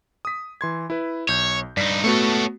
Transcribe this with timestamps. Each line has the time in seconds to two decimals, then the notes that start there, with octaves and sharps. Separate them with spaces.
0.25 D#6 B6
0.61 E3 C6 G#6
0.90 E4 B4
1.28 B1 C#5 G6
1.77 G2 D#4 D5 B6 C7
2.04 A3 B3 F#4 A4 C#5